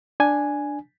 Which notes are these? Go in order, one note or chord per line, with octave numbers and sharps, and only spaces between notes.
D4 G#5